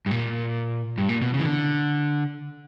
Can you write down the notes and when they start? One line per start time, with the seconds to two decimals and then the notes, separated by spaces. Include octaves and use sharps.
0.06 G2
0.11 A#2
0.98 G2
1.09 A#2
1.22 B2
1.34 C#3
1.39 E3
1.46 D3